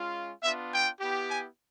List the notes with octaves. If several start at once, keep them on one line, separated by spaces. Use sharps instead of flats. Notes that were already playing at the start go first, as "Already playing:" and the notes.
Already playing: G#3 C#4 F4
B3 D4 F4 E5
G5
B3 E4 G4
G#5